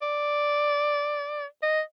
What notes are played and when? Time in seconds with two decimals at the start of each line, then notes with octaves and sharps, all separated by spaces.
0.02 D5
1.62 D#5